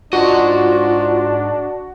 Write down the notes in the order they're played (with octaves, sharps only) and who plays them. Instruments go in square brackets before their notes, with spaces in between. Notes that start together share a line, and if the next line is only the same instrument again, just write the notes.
[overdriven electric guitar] G#2 D#5 [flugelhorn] D4 [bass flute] F4 [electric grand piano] F#4